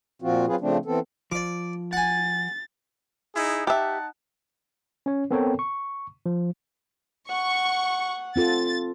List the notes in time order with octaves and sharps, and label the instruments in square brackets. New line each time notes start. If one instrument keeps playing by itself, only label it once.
[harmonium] A#2 F3 C4 F4 F#4
F#3 C4 F4 G#4 B4
C#3 F3 A3 C4 D4
E3 B3 C4 A4
[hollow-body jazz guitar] F3 [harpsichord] D5 D6
[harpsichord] F#5 G#5 [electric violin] A6
[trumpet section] D#4 E4 G#4
[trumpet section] D#4 F#5 A5 [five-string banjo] G4 E5
[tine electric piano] C#4 C#5
B3 C4 A4 A#4 C#5 G5
C#6
F3
[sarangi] F#5 [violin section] C#6
[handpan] C4 F4 A4 [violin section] A6